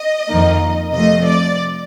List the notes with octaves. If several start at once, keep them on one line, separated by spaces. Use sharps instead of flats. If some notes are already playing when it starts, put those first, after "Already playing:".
Already playing: D#5
F2 D#3 A#3 D#4
C3 F3 A3 D#5
D5